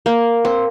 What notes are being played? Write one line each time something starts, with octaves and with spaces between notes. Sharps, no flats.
A#3
C4